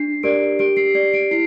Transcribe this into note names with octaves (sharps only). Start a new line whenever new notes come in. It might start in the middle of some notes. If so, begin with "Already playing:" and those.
Already playing: D4 C7
G4 A#4 D5 D7
G4 D7
C7
D5 C7
D7
E4 C7